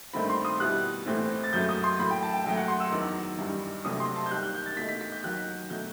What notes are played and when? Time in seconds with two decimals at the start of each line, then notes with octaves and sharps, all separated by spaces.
0.13 G2 D#3 A3 C4 B5
0.30 C6
0.45 D#6
0.60 B2 G3 B3 E4 F#6
1.06 A2 E3 A3 C4
1.44 A6
1.53 F#2 F#3 A3 G6
1.69 D#6
1.84 C6
1.99 A2 F#3 A3 B5
2.11 G5
2.23 A5
2.34 G5
2.46 F#2 F#3 A3 G5
2.57 F#5
2.68 C6
2.80 E6
2.92 E2 D#3 F#3
3.39 G2 E3 G3 D#4
3.85 C2 C3 F#3 A3 D#6
4.00 C6
4.16 A5
4.26 G6
4.31 D#2 D#3 G3 F#6
4.43 F#6
4.54 G6
4.66 A6
4.77 B2 A3 D#4 B6
4.89 B6
5.01 B6
5.12 G6
5.23 D#2 D#3 F#3 F#6
5.70 B2 F#3 A3 G6